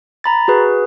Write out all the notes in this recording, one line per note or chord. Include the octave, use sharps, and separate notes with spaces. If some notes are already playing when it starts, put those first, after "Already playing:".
A#5 B5 A6
F#4 G#4 B4